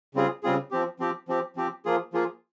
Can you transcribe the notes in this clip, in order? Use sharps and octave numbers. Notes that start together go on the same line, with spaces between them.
C#3 G3 C4 F4 G#4
C#3 G3 C4 F4 G#4
F3 C4 G4
F3 C4 G4
F3 C4 G4
F3 C4 G4
F3 A#3 F4 G#4
F3 A#3 F4 G#4